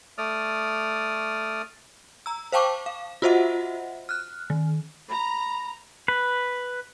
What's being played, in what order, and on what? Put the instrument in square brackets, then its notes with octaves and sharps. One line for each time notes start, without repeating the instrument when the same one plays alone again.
[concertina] A3 D5 D#6 F6
[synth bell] A#5 E6
C5 F5 G5 A5 C#6 D6
F5
F4 F#4 C5 D#5 E5 F#5
F6 F#6
D#3
[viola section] A#5 [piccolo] B5
[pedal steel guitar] B4